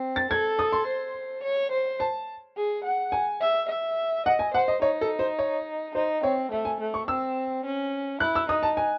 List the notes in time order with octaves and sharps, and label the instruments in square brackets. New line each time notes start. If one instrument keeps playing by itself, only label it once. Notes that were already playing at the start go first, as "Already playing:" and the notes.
Already playing: [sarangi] C4
[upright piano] A6
[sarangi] A4 [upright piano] G#6
[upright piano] D#6
C6
[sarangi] C5
C#5
C5
[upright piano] A5
[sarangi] G#4
F#5
[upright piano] G#5
[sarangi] E5
E5
[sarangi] D#5 [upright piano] F#5
[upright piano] G#5
[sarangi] C5 [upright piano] F#5
[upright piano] D#5
[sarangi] D#4 [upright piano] C#5
[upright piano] A4
C5
C#5
[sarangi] D#4 [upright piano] C5
[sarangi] C4 [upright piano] C#5
[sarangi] A3 [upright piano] E5
[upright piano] G#5
[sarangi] A3
[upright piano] C#6
[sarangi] C4 [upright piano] E6
[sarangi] C#4
[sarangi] E4 [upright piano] F#6
[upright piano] E6
[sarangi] D#4 [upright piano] D#6
[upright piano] A5
G#5